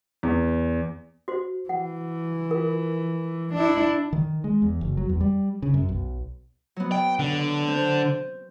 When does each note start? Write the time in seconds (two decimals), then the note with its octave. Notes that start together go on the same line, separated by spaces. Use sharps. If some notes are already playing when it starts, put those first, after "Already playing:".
0.23 E2
1.28 F#4 C5
1.69 E3 F#5
2.51 F4 A#4
3.53 D4 E4
4.13 D#3
4.44 G#3
4.62 E2
4.81 F#1
4.97 F#3
5.09 E2
5.21 G3
5.62 C#3
5.74 F#2
5.89 B1
6.76 F#3 B3
6.92 G5
7.19 D3
7.68 C4